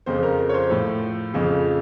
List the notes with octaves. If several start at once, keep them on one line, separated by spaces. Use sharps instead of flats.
F2 C#3 F3 C5
A#4
A#4
C#5
C5
A2 F3 A4
F2 C#3 F3